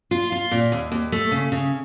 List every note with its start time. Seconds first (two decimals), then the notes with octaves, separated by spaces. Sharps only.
0.11 F4
0.32 F4
0.51 A#2
0.72 D#2
0.92 D#2
1.12 A3
1.32 C#3
1.52 C#3